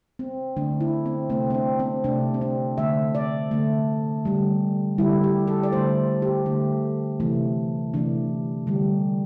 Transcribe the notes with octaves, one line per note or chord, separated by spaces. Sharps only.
C4
D3 A3 D4
E4
C4
C3 A3 C4
C4
D4
C4
C3 A3 D4
C4
D4
D3 A3 E5
D5
D3 A3
D3 G3
D3 G3 E4
G4
A4
D5
D3 A3 C5
G4
D3 A3
C3 E3 A3
C3 E3 A3 D4
D3 G3